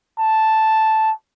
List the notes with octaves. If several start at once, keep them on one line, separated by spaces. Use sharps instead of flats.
A5